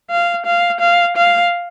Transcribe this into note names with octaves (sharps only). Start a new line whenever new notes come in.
F5
F5
F5
F5